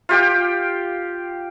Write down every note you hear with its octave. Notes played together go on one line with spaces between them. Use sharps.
F4 G4 G5